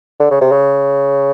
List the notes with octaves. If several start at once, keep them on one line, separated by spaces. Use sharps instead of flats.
D3
C#3
C3
C#3